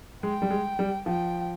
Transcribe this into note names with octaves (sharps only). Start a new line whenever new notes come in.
G#3 G5
G3
G#3
G3
F3 G5